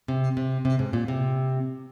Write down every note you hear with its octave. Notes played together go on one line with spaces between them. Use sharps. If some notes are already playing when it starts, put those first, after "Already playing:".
C3
C3
C3
G#2
A#2
C3